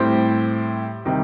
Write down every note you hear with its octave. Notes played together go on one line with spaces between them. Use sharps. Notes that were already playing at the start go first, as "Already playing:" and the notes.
Already playing: A2 G3 C4 G4 C5
C3 D#3 G3